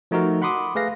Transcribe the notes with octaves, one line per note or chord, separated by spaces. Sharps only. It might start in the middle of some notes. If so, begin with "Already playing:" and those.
F3 A3 D#4 F#4 A#4
F#5 B5 C6 D6 D#6
A3 G#4 B4 F5 A#6